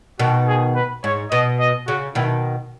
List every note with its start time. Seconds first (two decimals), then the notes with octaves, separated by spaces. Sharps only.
0.19 B2 D#3 F#4
0.47 G#4
0.75 B4
1.04 G#2 C#5
1.31 B2 D#5
1.60 D#5
1.87 C#3 F#4
2.15 B2 D#3 E4